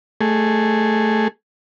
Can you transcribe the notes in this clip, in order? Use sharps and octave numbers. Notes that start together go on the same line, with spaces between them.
A3 G#4